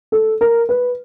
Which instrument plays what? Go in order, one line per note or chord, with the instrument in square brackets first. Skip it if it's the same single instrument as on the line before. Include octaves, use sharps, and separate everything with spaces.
[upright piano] A4
A#4
B4